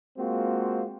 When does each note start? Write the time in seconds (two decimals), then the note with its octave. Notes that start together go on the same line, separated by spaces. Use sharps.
0.18 G#3 A#3 C4 F4 F#4